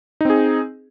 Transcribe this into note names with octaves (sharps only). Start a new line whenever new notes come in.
C4 D#4 G#4